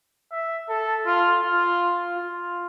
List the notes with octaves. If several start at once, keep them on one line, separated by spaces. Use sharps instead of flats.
E5
A4
F4
F4
F4